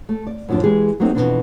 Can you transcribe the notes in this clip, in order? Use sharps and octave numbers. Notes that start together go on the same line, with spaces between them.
A3
D5
F#2 A2 F3 F#3 D4
E3 G#3 G4 G#4
F#3 A3 A#3 C4 D#4
F2 B2 D3 E3 C4 D4